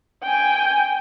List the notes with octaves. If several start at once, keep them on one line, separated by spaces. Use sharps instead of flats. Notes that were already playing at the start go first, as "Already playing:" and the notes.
G5 G#5